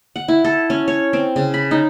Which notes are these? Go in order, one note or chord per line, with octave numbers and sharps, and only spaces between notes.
F#5
E4
A4
C#4
C#5
C4
C#3
B5
D#4